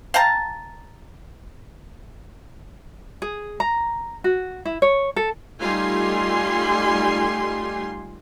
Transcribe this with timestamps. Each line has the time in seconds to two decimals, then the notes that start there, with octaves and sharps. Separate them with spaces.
0.14 F5 G5 A5 A#5
3.22 G#4
3.60 A#5
4.24 F#4
4.65 E4
4.82 C#5
5.16 A4
5.60 G3 A3 D#4 F4 G#5 C6